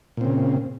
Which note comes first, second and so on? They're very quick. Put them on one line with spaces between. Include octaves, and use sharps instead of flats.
A#2 C4 C#3